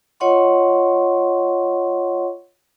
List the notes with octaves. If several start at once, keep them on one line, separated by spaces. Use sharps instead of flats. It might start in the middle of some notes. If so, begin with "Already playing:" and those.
F4 C#5 D#5 F#5 C6 C#6